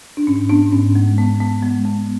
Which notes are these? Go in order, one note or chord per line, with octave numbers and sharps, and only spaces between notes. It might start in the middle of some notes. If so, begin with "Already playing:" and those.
D4
G#2 C#4
B3 D4
G#2 C#4
G#3
B3
B3
G#3
B3